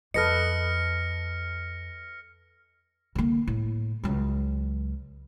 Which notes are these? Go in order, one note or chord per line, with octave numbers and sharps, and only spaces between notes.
F2 A4 B4 D#5 F6 A#6 C#7
D3 A#3
A2
C#2 F#3